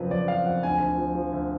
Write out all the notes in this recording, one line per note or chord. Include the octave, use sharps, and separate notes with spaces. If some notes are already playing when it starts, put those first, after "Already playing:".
Already playing: F#1 F2 F3 B4
F2 D5
F3 F5
F2 F#5
D2 G#5
D2
F3
F3
D2